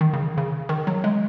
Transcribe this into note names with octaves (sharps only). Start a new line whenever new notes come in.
D#3
C#3
C#3
D#3
F#3
G#3